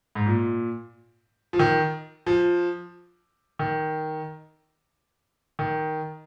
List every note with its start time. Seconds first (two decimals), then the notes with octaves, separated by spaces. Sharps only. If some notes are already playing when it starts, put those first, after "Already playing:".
0.15 G#2
0.26 A#2
1.53 F3
1.59 D#3
2.26 F3
3.59 D#3
5.59 D#3